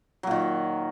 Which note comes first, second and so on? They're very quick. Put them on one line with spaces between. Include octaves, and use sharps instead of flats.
F#3 A#2 D#3